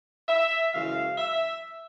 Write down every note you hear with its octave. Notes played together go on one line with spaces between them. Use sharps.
E5
F#2 C#3 E3 G#3 F5
E5